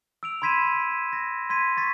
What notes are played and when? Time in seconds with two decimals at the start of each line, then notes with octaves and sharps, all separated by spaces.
0.23 E6 D7 F7
0.42 B5 C6 G#6 B6 D#7 E7
1.13 A#6
1.50 C6 G#6 B6 D#7
1.77 C#6 A6 B6